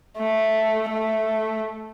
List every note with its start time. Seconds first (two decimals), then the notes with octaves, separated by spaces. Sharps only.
0.18 A3
0.90 A3